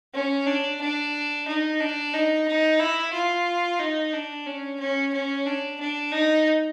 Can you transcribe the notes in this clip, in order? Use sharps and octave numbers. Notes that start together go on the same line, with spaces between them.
C#4
D4
D4
D#4
D4
D#4
D#4
E4
F4
D#4
D4
C#4
C#4
C#4
D4
D4
D#4